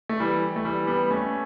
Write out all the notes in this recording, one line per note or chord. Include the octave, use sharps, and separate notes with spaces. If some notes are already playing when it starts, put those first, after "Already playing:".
A3
E3 G3
A3
E3 G3
G3 B3
A3 C#4